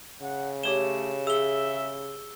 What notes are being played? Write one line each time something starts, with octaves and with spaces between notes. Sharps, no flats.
C#3 F#5
A3 G4 C#5 E7 G7
G#4 E5 E6 G7